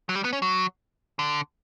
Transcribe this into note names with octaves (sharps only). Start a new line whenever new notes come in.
F#3
G3
B3
C#4
F#3
D3